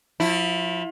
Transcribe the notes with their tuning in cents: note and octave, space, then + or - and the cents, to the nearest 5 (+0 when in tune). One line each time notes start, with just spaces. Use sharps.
F3 +30 E4 +0